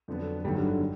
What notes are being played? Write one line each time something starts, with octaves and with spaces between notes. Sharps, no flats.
F2 D3 F#3 B3 D4
G1 G2 D#3 F#3 G3
D3
D3
G3